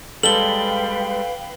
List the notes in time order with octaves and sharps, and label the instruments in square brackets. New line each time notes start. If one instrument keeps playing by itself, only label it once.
[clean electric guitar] G3 G#3 [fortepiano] A4 [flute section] B4 F5 G5 [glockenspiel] F#7 G7